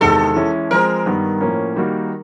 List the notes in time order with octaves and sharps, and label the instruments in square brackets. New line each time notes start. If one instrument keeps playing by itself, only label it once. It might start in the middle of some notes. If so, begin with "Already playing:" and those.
[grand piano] E2 C3 D#3 G#3 [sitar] A4
[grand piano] E3 G#3 C#4 E4
[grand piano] F3 G#3 C4 [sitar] A#4
[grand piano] G2 D#3 G3 B3
A2 F3 A#3 C#4
D#3 G3 A#3 D#4 F#4